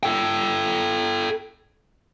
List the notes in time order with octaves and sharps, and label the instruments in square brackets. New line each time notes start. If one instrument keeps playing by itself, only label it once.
[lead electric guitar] A4 G5